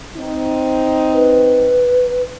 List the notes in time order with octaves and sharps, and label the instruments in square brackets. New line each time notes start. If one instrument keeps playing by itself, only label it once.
[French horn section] C4 D#4
[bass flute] B4